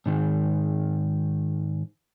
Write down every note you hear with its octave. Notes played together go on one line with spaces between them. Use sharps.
G#2 D#3